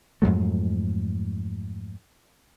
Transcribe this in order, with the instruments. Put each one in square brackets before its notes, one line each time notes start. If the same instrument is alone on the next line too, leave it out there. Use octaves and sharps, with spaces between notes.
[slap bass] F2 G#2 F#3 A3